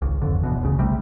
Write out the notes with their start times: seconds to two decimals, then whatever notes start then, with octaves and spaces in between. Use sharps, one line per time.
0.02 G#1 C#2
0.22 D#1 G#1 F2 D3
0.43 D1 E2 B2
0.62 F#1 D2 C#3
0.78 B1 C3 G3 A3